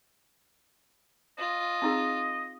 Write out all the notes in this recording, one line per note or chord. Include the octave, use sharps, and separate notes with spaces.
F4 D#5
C4 D#4 G#4